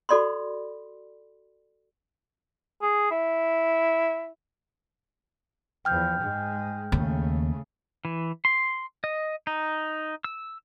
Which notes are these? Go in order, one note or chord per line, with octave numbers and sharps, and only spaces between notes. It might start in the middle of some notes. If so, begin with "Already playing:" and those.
F#4 A4 D5 B5 C6
G#4
E4
E2 F3 G5 F6 G6
G#2 G#3
D#2 C#3 A3
E3
C6
D#5
D#4
E6